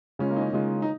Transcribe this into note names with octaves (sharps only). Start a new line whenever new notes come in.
C#3 G#3 C#4 F4
A#3
D#4
C#4
C#3 G#3 D#4 F4
D#4